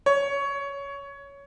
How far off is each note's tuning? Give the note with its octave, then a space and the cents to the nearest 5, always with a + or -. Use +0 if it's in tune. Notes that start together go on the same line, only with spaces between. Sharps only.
C#5 +15